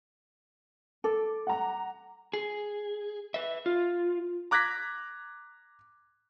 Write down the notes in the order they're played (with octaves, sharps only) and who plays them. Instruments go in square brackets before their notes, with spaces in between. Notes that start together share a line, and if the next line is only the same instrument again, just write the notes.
[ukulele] A4 [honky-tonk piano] D6
[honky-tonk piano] F#5 A#5
[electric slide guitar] G#4
B4 E5
F4
[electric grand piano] A#5 D6 F#6 G#6 A#6 B6